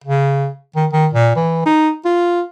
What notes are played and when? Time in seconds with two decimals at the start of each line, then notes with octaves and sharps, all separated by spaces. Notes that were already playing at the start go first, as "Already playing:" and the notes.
0.04 C#3
0.76 D#3
0.93 D#3
1.14 A#2
1.36 E3
1.66 D#4
2.05 F4